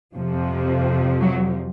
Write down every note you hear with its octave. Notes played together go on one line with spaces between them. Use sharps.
F2 C3 F3
F#3